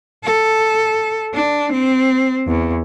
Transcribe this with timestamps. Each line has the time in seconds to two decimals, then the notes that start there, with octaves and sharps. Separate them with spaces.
0.24 A4
1.34 D4
1.73 C4
2.47 E2